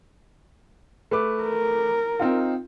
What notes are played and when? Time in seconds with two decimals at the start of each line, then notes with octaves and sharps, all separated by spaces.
1.11 A3 B4 D6
1.43 A#4
2.19 C4 D#4 F4